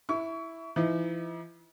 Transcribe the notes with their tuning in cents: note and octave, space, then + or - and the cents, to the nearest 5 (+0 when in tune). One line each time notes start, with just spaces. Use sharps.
E4 -5 C#6 +25
E3 +45 D#4 +45